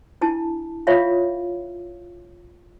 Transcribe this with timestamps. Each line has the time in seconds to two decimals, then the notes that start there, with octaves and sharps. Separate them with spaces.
0.21 D4 E4 A5
0.87 F4 G4 C#5 E5 F5